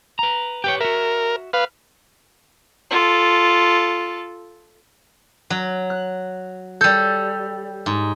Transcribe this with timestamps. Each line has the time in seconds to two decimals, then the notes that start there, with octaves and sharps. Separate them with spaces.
0.19 B4 A#5
0.64 G4 B4 C#5 G5
0.81 F#4 A#4 E5
1.53 B4 F5
2.90 F4 A4
5.50 F#3
5.90 F#6
6.81 G3 A4 G6
7.86 G#2